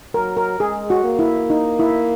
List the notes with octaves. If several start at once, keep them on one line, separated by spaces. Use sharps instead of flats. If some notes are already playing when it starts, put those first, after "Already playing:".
F#3 A#4
A#4
G#3 G#4
F#4
A#3
E4
D#4
E4